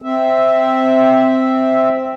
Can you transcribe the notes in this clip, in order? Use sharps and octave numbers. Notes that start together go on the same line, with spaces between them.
C4 E5